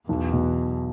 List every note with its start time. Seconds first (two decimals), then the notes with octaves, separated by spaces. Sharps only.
0.09 B1 E2
0.32 B2